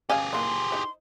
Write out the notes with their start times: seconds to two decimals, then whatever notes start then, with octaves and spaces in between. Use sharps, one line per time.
0.09 C#4 G4 G#4 D#5 F5 G#5
0.33 E3 A#3 D#4 C6
0.71 D#4 E4 C5